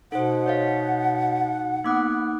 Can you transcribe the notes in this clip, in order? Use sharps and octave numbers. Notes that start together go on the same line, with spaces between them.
B2 D#4 A4 C5 F#5
C#5 D#5 F5
A#3 B3 D#4 D6 D#6 F#6